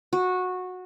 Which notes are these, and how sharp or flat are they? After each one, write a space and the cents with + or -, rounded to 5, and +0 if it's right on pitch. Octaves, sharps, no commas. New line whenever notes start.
F#4 -15